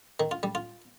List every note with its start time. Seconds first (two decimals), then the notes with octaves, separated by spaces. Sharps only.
0.20 D#3
0.31 F4
0.43 G3
0.55 F4